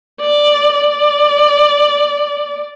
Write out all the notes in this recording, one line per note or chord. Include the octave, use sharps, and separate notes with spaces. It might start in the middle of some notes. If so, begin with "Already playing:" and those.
D5
D5